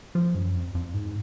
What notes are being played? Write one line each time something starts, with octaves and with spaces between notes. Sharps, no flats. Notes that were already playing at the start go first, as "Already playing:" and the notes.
F3
F#2
F2
F2
G#2